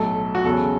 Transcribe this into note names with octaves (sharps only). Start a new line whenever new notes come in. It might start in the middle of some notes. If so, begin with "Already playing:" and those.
Already playing: B1 A2 F#3 A3 A4
F#4
E2 C#3 F#3 C#4 A4